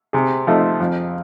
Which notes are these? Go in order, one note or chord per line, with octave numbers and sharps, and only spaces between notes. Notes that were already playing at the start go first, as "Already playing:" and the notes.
C3 G#4
F3 A3 C4 D#4
F2